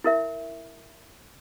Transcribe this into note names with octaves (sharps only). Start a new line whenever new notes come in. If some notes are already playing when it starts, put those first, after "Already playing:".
E4 A#4 E5